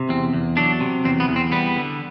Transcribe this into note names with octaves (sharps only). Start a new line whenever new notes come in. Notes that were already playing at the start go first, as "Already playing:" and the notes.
Already playing: C3
E2 C4
E2
F#3 D4
C3
E2 C4
B3
E2
C4
G3 B3
D3